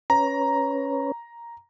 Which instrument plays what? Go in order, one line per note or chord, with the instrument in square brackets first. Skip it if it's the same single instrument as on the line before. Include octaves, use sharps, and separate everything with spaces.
[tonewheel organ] C#4 B4 C#5 [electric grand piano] A#5